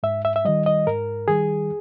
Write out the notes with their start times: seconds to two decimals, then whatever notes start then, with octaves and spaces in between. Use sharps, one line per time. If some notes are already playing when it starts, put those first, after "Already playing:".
0.03 G#2 E5
0.25 E5
0.36 E5
0.45 D#3 G3 D#5
0.66 D#5
0.87 G#2 A#4
1.28 D#3 G3 G#4